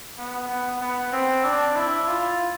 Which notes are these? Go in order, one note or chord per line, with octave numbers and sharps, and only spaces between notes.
B3
B3
B3
C4
D4
E4
F4